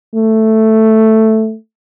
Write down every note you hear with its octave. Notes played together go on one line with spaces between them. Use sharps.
A3